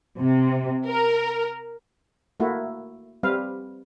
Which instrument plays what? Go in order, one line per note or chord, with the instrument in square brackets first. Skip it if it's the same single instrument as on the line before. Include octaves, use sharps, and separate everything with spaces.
[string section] C3
A#4
[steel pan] A3 A#3 E4 F#4
G3 C4 B4 F5